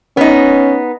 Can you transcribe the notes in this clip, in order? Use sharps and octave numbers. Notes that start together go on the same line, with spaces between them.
B3 C#4 D#4